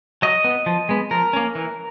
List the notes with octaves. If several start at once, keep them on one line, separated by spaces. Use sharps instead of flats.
F#3 D#5
B3
F3
G#3 B3
F3 A#4
A#3 C#4
E3